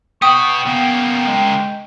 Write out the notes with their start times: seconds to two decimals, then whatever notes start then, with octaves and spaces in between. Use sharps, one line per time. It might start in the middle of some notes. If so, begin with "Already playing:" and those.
0.22 B3 F#4 G5 C#6 D#6
0.66 C#3 A#3 B3
1.28 G#3